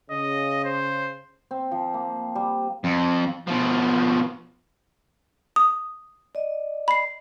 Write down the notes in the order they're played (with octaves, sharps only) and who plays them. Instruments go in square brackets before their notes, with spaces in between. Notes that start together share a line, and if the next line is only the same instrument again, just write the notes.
[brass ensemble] C#3 [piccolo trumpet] D#5
[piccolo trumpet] C5
[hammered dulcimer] C4
F3
A#3
G3
[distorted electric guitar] F2
B2 F3
[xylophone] D#6
[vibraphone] D5 D#5
[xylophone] B5 C7